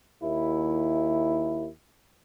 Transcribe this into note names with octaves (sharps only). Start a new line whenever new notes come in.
D#2 E4